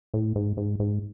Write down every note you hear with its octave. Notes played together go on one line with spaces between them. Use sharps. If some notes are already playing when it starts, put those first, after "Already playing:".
A2
G#2
G#2
G#2